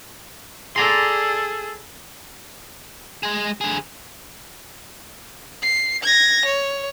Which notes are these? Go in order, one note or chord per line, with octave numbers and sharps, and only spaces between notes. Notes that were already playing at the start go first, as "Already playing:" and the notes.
G#4 A4 D5 A#5 C6
G#3 G#4
D3 G#4
C7
G#6 A#6
C#5